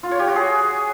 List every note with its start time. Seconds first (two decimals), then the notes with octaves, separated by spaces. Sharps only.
0.03 F4
0.11 C#5
0.19 G4
0.28 F#4
0.36 G#4